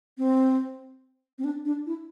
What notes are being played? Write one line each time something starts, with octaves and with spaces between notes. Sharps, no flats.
C4
C4
D4
D4
E4